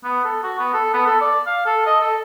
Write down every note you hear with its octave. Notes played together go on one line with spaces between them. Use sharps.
B3
A4
F#4
B3
A4
B3
A4
D5
F5
A4
D#5
A4